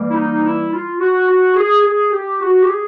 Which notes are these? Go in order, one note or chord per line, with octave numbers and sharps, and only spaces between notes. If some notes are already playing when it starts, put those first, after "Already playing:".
Already playing: E3 G3 A#3
E4
D#4
E4
F4
F#4
F#4
G#4
G#4
G4
F#4
G4
G#4